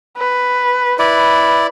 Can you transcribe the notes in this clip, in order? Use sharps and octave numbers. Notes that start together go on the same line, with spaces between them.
B4
E4 B4 D5